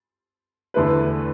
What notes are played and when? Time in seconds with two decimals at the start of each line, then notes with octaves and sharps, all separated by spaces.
0.74 E2 D3 A3 E4 B4